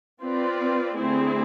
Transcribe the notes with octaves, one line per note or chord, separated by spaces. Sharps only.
C4 F4 B4 D5
D3 A3 C4 E4 G#4